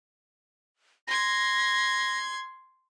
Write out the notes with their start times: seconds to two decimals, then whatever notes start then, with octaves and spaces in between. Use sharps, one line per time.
1.08 C6 G#6 A#6